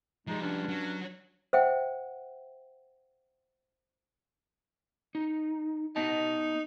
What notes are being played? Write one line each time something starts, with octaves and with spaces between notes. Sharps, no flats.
F3 G3 G#3 D#4
G2 C#4 D4
F#3
C5 E5 F#5 G5
D#4
B3 D#4 D#5 A5